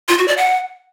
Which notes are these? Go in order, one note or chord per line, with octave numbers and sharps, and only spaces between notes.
F4
F#4
D5
F#5